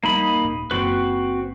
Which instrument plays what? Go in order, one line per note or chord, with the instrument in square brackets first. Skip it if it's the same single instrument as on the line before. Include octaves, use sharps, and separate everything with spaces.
[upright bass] D#2 G3 [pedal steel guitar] A#3 D#4 B5
[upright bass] D#1
[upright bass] F#1 [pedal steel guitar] C4 F#4 B4